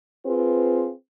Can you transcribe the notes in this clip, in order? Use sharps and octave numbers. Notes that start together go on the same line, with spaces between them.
C4 F4 G#4 B4